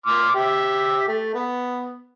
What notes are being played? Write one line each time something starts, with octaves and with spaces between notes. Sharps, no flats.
C6 D6 F6
G4 E5
A3
B3